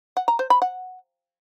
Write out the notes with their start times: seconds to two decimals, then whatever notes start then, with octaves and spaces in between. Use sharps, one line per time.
0.17 F#5
0.28 A#5
0.39 C5
0.50 B5
0.62 F#5